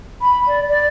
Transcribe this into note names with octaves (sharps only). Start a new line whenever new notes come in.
B5
D5
D5